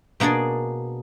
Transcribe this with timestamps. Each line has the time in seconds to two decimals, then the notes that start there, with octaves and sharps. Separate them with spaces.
0.20 B2 A#3 D4 G#4 D5